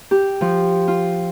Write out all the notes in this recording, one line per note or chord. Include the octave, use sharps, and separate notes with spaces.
G4
F3
F4